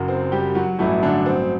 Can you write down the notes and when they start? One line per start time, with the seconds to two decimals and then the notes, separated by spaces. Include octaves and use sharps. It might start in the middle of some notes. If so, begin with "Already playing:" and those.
Already playing: F#1 F#2 F#3
0.08 C4
0.32 G3 G4
0.55 F#3 F#4
0.79 A1 G2 E3 F#3 A3 E4
1.03 D3 D4
1.26 C4